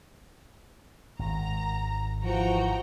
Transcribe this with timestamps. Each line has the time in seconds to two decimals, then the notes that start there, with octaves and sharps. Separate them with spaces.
1.19 G#1 A#5
2.24 E3 F3 F#4 G5 A#5